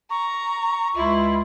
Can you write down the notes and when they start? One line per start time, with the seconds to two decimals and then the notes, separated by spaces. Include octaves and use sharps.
0.10 A#5 C#6
0.96 C#2 E4 F4